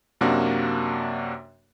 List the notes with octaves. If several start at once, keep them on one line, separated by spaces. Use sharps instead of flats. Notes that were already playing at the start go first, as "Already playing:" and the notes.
F#2 C3 A#3 D4 F#4